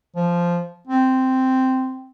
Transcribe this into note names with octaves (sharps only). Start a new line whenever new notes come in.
F3
C4